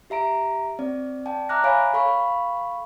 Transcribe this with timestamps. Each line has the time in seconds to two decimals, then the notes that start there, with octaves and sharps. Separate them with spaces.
0.10 G4 E5 A#5 D7
0.79 C4 D5
1.26 D5 G5 A5
1.49 E5 A#5 D6 F6 F#6 A#6
1.64 C#5 F5 G#5 B5 D7
1.94 A4 F5 B5 C#6